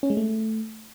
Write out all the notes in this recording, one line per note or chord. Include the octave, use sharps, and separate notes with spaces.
C#4
G#3
A3